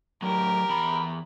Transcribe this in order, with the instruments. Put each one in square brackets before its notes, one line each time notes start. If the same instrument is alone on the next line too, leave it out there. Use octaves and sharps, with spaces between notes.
[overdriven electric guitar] A2 F#3 [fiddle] G4 A#4
[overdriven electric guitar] E2 B5